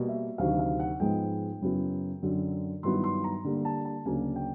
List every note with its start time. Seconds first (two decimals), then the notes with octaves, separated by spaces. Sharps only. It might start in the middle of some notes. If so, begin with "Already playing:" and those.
Already playing: B2 G3 A#3
0.08 E5
0.38 D2 C3 D#3 F#3 F5
0.59 F5
0.79 F#5
1.00 G#2 F3 G#3 B3 D#4 G5
1.61 F#2 C#3 F#3 B3 E4
2.22 F#2 D3 F#3
2.83 G2 D#3 F#3 B3 E4 C6
3.04 C6
3.24 A#5
3.44 D3 G3 A#3
3.65 A5
3.85 A5
4.05 D2 C#3 F#3 A#3 D4 G#5
4.36 G5